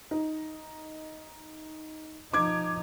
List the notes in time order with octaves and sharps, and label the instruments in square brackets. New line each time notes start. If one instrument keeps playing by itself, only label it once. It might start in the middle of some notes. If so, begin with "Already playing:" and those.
[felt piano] D#4
[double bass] F3 D#4 [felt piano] D6 G#6